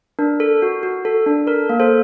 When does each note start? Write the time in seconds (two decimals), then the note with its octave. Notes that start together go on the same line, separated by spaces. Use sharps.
0.19 D4 A#4
0.40 A4
0.62 F#4
0.83 F#4
1.05 A4
1.26 D4
1.47 A4 A#4
1.70 A#3
1.80 A4 C5